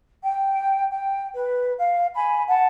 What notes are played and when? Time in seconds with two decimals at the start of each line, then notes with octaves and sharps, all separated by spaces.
0.23 G5
0.90 G5
1.35 B4
1.78 F5
2.16 G#5 B5
2.48 F#5 A5